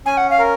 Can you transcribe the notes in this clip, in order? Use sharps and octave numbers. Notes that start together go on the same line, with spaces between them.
C#4 G#5
F#5
F5
A#4